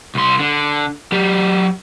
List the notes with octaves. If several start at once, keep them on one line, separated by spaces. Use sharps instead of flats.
C2 C6
D3
F#3 G4